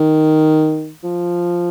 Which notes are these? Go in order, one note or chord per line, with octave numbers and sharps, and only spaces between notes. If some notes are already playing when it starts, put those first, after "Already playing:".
Already playing: D#3
F3